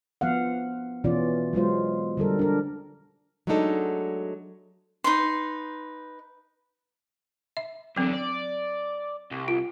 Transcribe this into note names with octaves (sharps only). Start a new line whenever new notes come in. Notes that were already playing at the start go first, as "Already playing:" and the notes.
F3 B3 F5 F#5
B2 E3 C#4 F4 D5
F#3 G#3 F4 C5
D3 G3 A4 A#4
D4 A#4
F#3 G#3 A3 D4 D#4 A4
D#4 B4 C6
E5
E2 D3 F#3 C4
D5
C2
F4